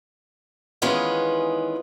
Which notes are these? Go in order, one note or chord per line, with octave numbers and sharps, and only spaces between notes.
D#3 E3 G#3 B3 C#4 F4